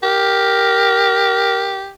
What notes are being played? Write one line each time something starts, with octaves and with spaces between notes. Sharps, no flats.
G4 A#4